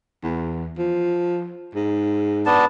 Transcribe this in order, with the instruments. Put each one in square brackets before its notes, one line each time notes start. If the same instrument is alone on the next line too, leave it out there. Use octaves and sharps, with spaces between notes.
[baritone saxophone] E2
F3
G#2
[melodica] B3 D4 A5